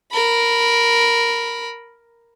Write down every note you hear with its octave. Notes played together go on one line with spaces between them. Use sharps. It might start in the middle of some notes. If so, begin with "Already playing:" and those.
A#4 B5